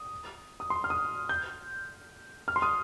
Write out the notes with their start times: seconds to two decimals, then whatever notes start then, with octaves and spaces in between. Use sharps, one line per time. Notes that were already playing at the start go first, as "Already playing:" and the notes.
Already playing: D#6
0.60 D#6
0.70 C6
0.84 F6
0.90 D#6
1.29 G6
2.48 F6
2.56 C6
2.62 D#6